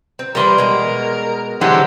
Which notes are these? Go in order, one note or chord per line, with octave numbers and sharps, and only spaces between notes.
C4
E3 G3 A#4 B5 C6 D#6
B2 G#3
D3 E3 F#3 G#3 G4 C5 D5 F#5